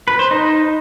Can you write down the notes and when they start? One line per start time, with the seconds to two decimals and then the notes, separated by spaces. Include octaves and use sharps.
0.08 B4
0.19 C5
0.31 D#4